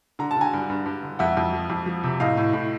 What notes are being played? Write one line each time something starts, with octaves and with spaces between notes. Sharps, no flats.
D3 A#5
A5
D3 G#5 A#5
G2
G2
G2
D3
F2 E5 F#5
F2
F3
F2
F3
C3
A2 D#5 F5
A2
A2